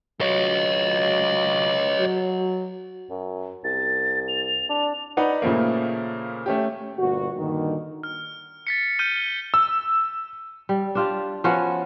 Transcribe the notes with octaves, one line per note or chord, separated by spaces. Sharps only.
F#3 C#5 D#5
F#3
F#2
C2 A6
F7
D4
D#4 B4 D5 F#5
A#2 C#3 F3 A3 A#3
A3 C#4 G4
G1 A#2 A#3 F#4
G2 A#2 D3 D#3
F6
A6 B6 C#7
F6 G6 A6 D#7 G7
G7
E6
G3
D4 F4 G4
F3 B3 C#4 F#4